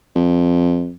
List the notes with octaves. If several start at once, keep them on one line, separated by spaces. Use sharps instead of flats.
F2